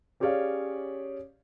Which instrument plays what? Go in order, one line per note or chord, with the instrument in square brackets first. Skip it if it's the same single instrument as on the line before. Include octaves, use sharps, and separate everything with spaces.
[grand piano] C#4 G4 G#4 C#5 D5 F5